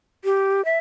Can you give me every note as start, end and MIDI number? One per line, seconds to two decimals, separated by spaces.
0.25 0.64 67
0.65 0.79 76